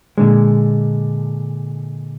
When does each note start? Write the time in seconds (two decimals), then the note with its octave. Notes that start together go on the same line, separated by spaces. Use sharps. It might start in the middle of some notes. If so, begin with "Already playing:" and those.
0.18 A#2 D3 G#3